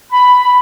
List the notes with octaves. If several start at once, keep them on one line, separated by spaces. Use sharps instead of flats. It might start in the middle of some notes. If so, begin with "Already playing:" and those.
B5